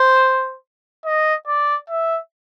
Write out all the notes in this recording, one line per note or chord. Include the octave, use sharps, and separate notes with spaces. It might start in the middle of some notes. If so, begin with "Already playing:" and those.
Already playing: C5
D#5
D5
E5